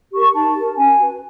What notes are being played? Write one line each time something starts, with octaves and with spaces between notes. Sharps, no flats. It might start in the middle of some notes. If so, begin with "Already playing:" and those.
G4 A#4 C#6
D#4 A5
G4 A#4
C#4 G#5
F#4 B4